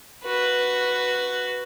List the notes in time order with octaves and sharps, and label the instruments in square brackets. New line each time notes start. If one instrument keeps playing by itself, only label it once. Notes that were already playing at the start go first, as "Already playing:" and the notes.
[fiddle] F#4 B4